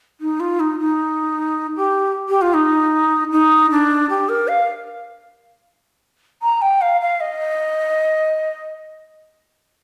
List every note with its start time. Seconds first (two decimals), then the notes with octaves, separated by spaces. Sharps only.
0.21 D#4
0.40 F4
0.60 D#4
0.79 D#4
1.76 G4
2.29 G4
2.42 F4
2.54 D#4
3.31 D#4
3.71 D4
4.10 G4
4.29 A#4
4.48 F5
6.42 A#5
6.62 G5
6.81 F5
7.01 F5
7.20 D#5